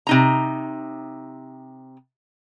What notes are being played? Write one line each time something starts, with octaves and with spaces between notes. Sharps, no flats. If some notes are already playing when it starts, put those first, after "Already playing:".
C3 D#4 A#5